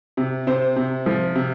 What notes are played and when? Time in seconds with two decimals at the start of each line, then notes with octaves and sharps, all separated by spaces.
0.17 C3
0.47 C3 C5
0.76 C3
1.06 F3
1.35 C3